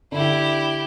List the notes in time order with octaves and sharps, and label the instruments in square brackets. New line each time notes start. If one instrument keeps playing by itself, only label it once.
[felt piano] D3 [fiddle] E4 G4